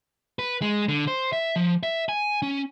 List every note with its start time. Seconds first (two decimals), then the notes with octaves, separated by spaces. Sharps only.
0.39 B4
0.62 G#3
0.88 D3
1.07 C5
1.33 E5
1.56 F3
1.83 E5
2.09 G#5
2.42 C#4